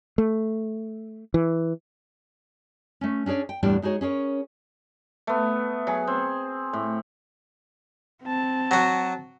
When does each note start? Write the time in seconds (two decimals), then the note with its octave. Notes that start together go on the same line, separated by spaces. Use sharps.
0.18 A3
1.34 E3
3.01 A3 C#4
3.26 C#4 D4 G#4 C#5 D5
3.49 G5
3.63 E2 A2 G3 B3 D4 G5
3.82 G#3 D#4 F#4 G#4 C#5
4.01 C#4 G#4 A#4 C#5
5.27 A3 B3
5.87 F#3 G#4
6.07 C4
6.73 A2
8.23 C4 A5
8.71 F#3 F#4